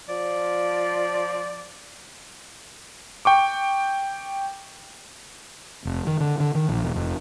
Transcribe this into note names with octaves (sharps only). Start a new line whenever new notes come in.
F3 D5
G5 C#6 D6
F1
D#3
D3
D3
D#3
A#1
E1
F1